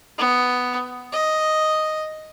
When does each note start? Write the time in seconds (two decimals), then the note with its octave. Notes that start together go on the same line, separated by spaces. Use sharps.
0.18 B3
1.12 D#5